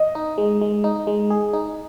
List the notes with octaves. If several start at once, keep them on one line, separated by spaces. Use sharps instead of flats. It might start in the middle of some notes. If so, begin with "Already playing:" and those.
Already playing: D#5
D#4
G#3
G#3
D#4
G#3
G#4
D#4